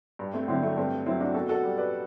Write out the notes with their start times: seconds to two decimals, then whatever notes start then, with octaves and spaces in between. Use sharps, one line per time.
0.19 G2
0.34 A3 C4
0.48 D3 F#3 C4 E4
0.62 A3 C4
0.76 G2 A3 C4
1.06 F#3 C4 E4
1.20 D4 F#4
1.34 B2 F#4 A4
1.49 F#4 A4
1.63 G3
1.78 B4 D5